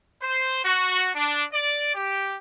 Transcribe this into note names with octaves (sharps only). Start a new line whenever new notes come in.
C5
F#4
D4
D5
G4